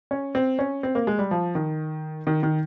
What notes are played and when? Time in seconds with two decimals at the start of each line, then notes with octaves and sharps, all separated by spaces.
0.11 C#4
0.35 C4
0.59 C#4
0.83 C4
0.95 A#3
1.07 G#3
1.19 G3
1.31 F3
1.55 D#3
2.27 D#3
2.43 D#3